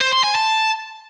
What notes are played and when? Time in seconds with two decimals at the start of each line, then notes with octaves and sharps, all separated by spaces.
0.01 C5
0.12 C6
0.23 G#5
0.35 A5